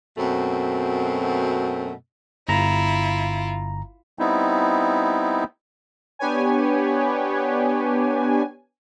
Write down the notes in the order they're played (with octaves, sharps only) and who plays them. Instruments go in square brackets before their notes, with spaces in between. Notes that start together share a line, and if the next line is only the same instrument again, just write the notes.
[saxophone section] F#2 B2 A3 C4
[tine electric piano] G1 A#5 [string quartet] E4 F4
[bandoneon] G3 B3 C4 D#4 E4
[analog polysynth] B3 D4 G4 B4 C#5 G#5